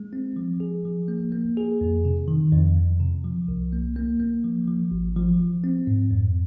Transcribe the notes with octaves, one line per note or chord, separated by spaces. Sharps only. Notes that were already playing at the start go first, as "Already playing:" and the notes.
Already playing: G#3
C4
F3
G#4
F3
A#3
A#3
G#4
F2
C3
D#3
F2
F2
C3
F3
C2
A#3
A#3
A#3
F3
F3
G#1
F3
F3
C4
G#2
F2